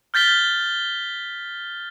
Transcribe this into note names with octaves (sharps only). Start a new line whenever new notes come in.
F6 G6 A6 B6 G7